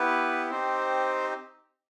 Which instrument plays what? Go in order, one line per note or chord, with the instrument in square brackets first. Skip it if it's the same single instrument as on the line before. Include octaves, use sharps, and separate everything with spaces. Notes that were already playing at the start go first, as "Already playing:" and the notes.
Already playing: [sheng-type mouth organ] B3 E4 G4 B4
C4 D#4 G4 C5